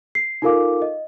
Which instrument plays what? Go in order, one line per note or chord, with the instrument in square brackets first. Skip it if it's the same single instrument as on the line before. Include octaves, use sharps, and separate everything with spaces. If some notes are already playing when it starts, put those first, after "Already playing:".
[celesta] C7
D#4 F4 A4 A#4 F5 D6
D#5